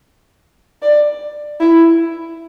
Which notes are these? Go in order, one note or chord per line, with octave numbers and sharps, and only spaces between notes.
D5
E4